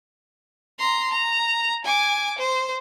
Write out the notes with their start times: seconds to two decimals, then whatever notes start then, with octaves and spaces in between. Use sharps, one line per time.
0.79 A#5 C6
1.11 A#5
1.85 G#5 D6
2.39 C5